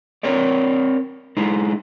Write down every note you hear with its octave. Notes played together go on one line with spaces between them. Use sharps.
C4 A#4 C#5 D5
G#3 D#4 E4